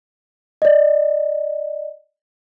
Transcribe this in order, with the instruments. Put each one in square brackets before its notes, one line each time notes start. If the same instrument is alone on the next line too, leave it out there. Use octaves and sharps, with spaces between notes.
[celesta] D5 D#5